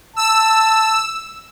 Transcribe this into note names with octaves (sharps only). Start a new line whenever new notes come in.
A5 E6